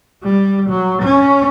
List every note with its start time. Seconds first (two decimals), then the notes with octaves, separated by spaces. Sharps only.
0.24 G3
0.69 F#3
1.02 C#4